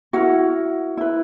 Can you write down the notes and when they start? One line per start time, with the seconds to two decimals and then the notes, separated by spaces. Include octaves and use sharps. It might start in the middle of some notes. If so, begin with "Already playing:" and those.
0.13 E4 F#4 A#4 F#5
0.97 E4 B4